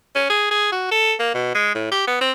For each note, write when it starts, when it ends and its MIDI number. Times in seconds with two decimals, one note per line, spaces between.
0.15 0.25 61
0.29 0.49 68
0.51 0.70 68
0.72 0.88 66
0.91 1.14 69
1.19 1.29 58
1.34 1.54 47
1.55 1.74 56
1.75 1.87 45
1.92 2.06 67
2.07 2.18 59
2.21 2.32 60